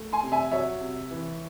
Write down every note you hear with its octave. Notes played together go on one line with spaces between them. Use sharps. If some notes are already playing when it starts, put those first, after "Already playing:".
Already playing: A3
G#5 C6
C3
E5 G#5
F#3 C#5 E5
C3
E3